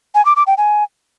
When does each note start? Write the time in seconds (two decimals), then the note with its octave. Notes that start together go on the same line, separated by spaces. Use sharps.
0.15 G#5
0.25 D6
0.36 D6
0.47 G5
0.57 G#5